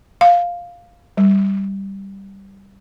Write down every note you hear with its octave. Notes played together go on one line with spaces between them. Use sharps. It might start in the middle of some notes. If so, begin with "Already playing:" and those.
F5
G3